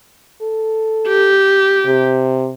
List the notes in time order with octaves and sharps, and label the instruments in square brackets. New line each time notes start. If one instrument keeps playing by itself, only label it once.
[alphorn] A4
[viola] G4
[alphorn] C3